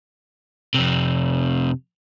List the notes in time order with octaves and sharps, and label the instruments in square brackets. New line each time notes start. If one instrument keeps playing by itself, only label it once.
[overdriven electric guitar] F2 C3